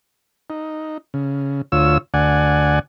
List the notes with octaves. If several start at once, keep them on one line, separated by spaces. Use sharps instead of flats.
D#4
C#3
D2 F4 C#5 E6
D2 D5 F#5 G#5